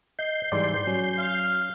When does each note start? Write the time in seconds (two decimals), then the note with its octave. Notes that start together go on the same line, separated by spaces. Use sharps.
0.19 D#5 G6 C7
0.52 G#2 E3 G3 D5 C6
0.87 F#3 C#4
1.18 F5